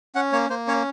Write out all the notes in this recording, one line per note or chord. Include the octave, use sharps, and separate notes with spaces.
C#4 F#5
A#3 C#5
A#3 C5
C#4 C#5